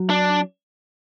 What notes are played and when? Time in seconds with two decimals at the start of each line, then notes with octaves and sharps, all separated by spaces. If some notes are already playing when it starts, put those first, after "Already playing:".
Already playing: F#3
0.10 D4